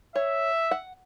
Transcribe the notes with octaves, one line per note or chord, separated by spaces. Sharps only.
C#5 E5
F#5